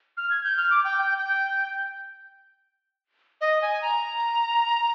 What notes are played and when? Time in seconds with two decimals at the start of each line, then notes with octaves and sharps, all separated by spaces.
0.17 F6
0.30 G#6
0.44 G6
0.57 F6
0.71 D6
0.84 G5
0.98 G5
1.18 G5
3.41 D#5
3.62 G#5
3.82 A#5